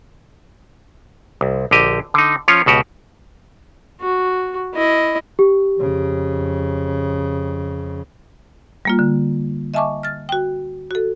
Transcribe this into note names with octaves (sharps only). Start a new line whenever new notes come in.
C2
A#1 D3 G4 D#5
D3 D#4
F3 C#4 F4 C#5
C#2 B2 F#4 G4
F#4
E4 D#5
G4
F2 C#3
G3 A#3 F4
D3
D#5 E5 G#5 A5 C#6 D6
F6 A6
F#4 G5
F#4 A4